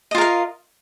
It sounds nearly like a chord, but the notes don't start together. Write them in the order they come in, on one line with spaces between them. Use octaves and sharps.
D#5 F4 A#4 F5